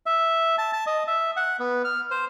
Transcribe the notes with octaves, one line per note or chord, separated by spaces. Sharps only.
E5
A5
A5
D#5
E5
F#5
B3
F6
C5